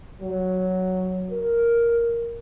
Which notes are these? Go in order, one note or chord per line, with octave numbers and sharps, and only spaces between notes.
F#3
A#4